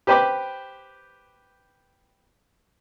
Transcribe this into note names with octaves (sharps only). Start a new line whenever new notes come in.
G4 B4 C5 G5 B5 D6